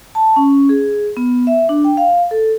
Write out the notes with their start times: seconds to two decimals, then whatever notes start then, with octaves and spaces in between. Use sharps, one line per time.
0.15 A5
0.36 C#4
0.69 G#4
1.17 B3
1.47 E5
1.69 D4
1.84 G5
1.97 F5
2.31 A4